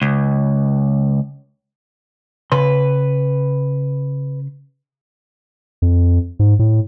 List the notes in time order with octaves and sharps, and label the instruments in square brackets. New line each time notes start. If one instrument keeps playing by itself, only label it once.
[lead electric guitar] C#2
[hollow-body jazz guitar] C#3 C6 [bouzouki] B4
[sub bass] F2
G#2
A2